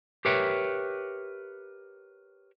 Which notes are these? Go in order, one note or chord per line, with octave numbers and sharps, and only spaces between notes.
G4 A#4 B4 C#5 E5 G5